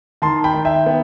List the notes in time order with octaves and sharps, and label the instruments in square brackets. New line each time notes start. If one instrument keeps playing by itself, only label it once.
[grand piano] D#3 A5 C6
G5 B5
D#3
E5 G5
B3